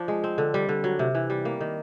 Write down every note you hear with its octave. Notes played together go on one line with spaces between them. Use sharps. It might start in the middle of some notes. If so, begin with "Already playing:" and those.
Already playing: F3 D4
G#3
C4
D3
G3
D3
F#3
C3
E3
G3
A#3
D#3